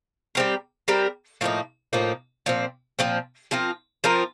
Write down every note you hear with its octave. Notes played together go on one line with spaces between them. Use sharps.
G3 C4 G4 A#4
G3 C4 G4 A#4
A2 F3 A#3 D#4
A2 F3 A#3 D#4
A#2 F3 C4
A#2 F3 C4
F3 C4 F4 A#4
F3 C4 F4 A#4